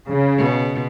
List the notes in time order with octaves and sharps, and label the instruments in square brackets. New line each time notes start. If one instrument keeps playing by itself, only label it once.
[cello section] C#3
[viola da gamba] B2